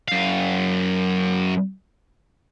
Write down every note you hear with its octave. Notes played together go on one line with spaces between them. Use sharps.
F#2 F5